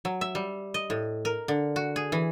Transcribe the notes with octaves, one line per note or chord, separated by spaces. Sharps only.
F#3
E5
G3
D#5
A2
A#4
D3
F#4
G#4
E3